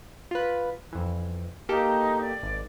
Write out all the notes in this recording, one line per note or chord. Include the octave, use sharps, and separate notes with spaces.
F4 B4
F2 E3
A#3 D#4 G4 A4
D5
G#1